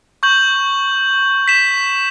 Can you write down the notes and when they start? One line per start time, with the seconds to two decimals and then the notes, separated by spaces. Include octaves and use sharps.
0.23 C#6 G6 F#7
1.48 B6 E7